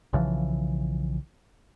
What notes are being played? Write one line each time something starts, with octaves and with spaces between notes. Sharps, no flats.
B1 C#3 E3 F3